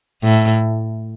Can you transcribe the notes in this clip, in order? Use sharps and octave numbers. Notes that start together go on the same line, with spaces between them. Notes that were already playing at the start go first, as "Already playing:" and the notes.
A2